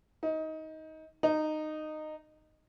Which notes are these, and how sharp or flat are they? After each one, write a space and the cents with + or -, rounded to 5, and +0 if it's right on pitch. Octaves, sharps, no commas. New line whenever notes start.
D#4 +20
D#4 -15